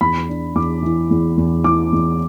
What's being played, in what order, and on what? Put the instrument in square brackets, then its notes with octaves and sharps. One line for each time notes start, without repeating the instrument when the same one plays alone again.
[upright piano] E2 B5
D4
E2 D6
E3
E2
E2
E3 D6
E2